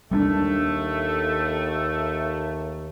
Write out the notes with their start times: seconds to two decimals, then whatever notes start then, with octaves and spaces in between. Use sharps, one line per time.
0.11 D#2 G3 A3 B3 D4